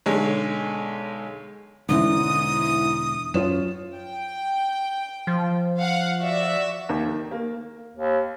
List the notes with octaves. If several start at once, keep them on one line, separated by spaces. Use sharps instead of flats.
B1 D3 G#3 C#5
E1 G#2 D3 E3 C#4 D#6
F#2 F4 C#5 E7
G5
F3
F5 F#5
F#4 D5 E5
D#2
D#3
A#3
D#2